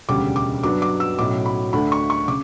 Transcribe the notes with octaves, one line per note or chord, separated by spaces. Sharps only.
E1 D2 C#3 G3 D6
D6
G2 F#3 B3 D4 D6
D6
E6
B1 A2 F#3 C#4 D6
B5
D2 D3 A3 D4 B5
C#6
C#6
C#3 D6